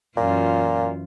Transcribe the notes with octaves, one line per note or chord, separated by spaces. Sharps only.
F#2 A#2 E3 F4